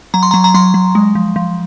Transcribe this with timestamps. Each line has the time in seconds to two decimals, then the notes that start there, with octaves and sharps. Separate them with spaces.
0.14 F#3 A#5
0.23 C6
0.31 F#3 A#5
0.44 A#5
0.54 F#3 C6
0.74 F#3
0.95 G#3
1.15 F3
1.36 F3